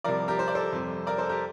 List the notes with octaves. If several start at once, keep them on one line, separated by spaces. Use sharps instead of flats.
C2 C3 F3 A#4 D5
G4 A#4
C5
D5
A4 C5
F2 C3 G3
A#4 D5
A4 C5
G4 A#4